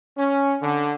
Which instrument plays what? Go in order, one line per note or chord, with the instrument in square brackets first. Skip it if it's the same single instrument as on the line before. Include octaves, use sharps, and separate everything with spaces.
[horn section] C#4
D3